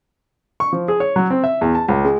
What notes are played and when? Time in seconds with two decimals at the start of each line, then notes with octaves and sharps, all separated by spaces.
0.60 C#6
0.73 F3
0.88 G#4
1.00 C#5
1.16 F#3
1.30 C4
1.44 E5
1.61 E2
1.75 A5
1.88 C#2
2.05 G#3